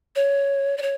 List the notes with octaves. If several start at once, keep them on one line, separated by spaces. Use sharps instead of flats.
C#5
D5
C#5